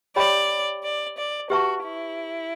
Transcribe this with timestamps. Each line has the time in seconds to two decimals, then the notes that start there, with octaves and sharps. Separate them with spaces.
0.16 G4 C#5 D5 E5 G5 B5
0.83 D5
1.17 D5
1.50 F#4 G4 B4 E5 A5 C#6
1.84 E4